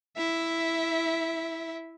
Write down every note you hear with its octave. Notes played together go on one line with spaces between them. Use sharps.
E4 E5